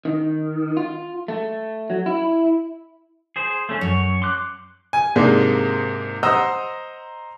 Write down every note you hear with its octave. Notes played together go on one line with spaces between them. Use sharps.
D#3
F4
A3
F#3
E4
G#4 C5
A3 C#4
F#2 C#5
C6 D6 F#6
G#5
G#2 C3 G#3 A#3 D4
C5 D#5 F#5 A#5 D#6 E6